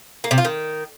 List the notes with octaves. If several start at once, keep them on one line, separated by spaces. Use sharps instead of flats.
A#3
C3
F4
D#3